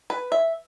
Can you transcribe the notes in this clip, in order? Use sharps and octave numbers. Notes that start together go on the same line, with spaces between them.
B4
E5